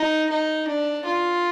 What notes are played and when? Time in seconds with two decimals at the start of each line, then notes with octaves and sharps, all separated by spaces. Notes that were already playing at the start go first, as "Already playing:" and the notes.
Already playing: D#4
0.29 D#4
0.68 D4
1.05 F4